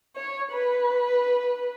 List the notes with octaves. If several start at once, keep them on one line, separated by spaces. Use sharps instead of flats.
C#5
B4